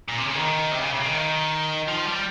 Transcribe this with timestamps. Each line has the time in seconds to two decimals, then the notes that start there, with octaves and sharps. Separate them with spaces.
0.08 A#2
0.18 C3
0.27 C#3
0.35 D#3
0.72 C3
0.81 C#3
0.93 C3
0.99 C#3
1.05 D#3
1.88 F3
2.06 G3